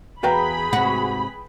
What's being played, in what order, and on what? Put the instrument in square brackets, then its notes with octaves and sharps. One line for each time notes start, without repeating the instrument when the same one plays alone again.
[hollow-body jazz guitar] E2 F#4 F5 [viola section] G#4 B5 [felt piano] B4 G5 A#5
[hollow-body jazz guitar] G#2 C3 [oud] F#4